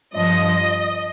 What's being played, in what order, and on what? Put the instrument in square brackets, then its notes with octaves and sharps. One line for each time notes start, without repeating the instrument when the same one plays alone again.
[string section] G2 F3 D#5